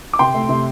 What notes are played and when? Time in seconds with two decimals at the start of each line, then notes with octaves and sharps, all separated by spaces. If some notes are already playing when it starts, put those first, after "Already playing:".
0.13 D6
0.19 C3 G5 C6
0.34 A3
0.49 C3